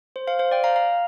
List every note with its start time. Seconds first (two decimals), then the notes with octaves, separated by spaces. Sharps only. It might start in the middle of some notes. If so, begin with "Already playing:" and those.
0.16 C5
0.27 C5 F5
0.39 C5 F5
0.51 D5 G5
0.64 F5 A#5
0.76 F5 A#5